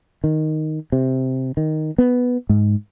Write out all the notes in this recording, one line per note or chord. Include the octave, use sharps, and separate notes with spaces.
D#3
C3
D#3
B3
G#2